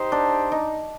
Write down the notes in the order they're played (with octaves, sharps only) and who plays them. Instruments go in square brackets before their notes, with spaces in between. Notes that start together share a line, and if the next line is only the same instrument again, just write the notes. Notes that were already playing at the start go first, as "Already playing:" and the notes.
Already playing: [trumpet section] D#4 G4 C5
[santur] D4
D#4